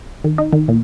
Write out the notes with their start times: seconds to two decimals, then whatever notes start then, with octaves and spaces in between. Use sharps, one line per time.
0.24 D#3
0.38 D#4
0.53 D#3
0.68 A#2